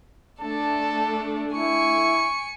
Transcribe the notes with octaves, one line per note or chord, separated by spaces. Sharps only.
A3 D4 A4 A5
E4 G#5 C#6 C#7